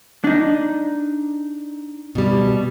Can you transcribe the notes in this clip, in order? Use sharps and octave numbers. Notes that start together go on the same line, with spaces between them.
D4 D#4
B2 G3